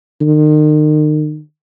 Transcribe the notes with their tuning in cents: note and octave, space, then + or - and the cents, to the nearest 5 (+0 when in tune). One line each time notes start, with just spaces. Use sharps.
D#3 -35